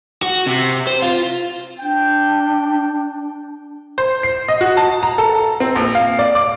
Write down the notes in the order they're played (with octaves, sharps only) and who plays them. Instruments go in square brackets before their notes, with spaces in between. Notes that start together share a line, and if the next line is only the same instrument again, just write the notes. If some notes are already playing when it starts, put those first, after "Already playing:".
[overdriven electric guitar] F#4
C3
C5
F4
[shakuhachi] D4 [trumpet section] G5
[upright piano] C5
C7
D#5
F#4
A5
A#5
A4
C4
A#1
F5
D5
D6